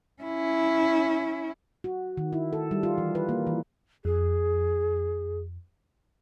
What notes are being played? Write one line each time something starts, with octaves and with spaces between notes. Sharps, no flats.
C#4 E4
F#4
D#3
E4
A4
G3
F4
E3
B4
A#3
E3
F2 G#4